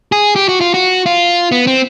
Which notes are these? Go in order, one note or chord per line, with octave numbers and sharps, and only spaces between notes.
G#4
G4
F#4
F4
F#4
F4
B3
C4